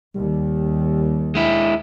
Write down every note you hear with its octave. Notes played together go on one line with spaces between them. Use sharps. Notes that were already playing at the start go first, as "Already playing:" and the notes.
D#2 G3
G#3 E4